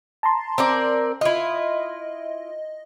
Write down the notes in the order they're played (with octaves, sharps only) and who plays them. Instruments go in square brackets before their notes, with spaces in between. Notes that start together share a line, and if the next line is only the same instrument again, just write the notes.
[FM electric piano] A5 A#5 C6
[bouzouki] C4 A#4 D5
[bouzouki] E4 F4 [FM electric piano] D#5